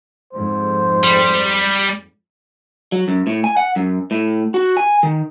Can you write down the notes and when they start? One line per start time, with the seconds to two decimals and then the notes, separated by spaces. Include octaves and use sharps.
0.33 F2 G#2 C5
1.03 G3
2.92 F#3
3.08 F#2
3.27 A2
3.44 G#5
3.57 F#5
3.76 F#2
4.11 A2
4.54 F#4
4.77 G#5
5.03 D#3